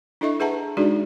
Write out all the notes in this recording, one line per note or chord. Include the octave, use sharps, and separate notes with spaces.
D4 E4 A4 D#5 E5 C#6
G#4 B4 E5 F#5 A5 A#5
G#3 D4 D#4 F#4 G#4 D5